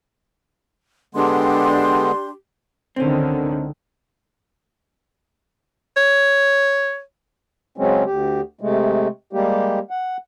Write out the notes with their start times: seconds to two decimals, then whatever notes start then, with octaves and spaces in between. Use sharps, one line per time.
1.15 D3 G#3 B3 D4 G4 C6
2.96 C#2 D3 D#3 C4 C#4
5.97 C#5
7.78 C#3 F#3 G#3 C4 C#4
8.05 D2 G4
8.61 C3 G#3 A3
9.33 G3 G#3 A#3 G4
9.90 F#5